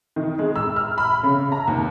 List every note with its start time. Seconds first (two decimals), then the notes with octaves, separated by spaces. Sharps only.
0.16 D#3
0.39 G#3
0.56 E6
0.76 F6
0.98 B5
1.23 C#3
1.52 A#5
1.68 D#2